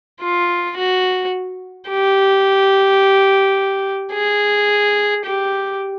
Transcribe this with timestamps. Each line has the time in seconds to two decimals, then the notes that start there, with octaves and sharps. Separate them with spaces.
0.22 F4
0.77 F#4
1.90 G4
4.13 G#4
5.25 G4